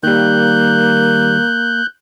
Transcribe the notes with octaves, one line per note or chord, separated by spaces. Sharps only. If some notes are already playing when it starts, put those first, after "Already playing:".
D#3 G3 A#3 F#6 G6